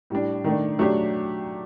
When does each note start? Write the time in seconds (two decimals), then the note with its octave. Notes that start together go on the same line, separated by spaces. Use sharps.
0.10 A2 G3 D4
0.44 D#3 A3 D4
0.79 F#3 A3 D4 G4